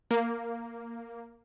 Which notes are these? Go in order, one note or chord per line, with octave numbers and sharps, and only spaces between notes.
A#3